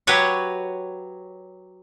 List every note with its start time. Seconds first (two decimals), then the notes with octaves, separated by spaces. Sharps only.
0.07 F#3 G4 B4 C#5 F#5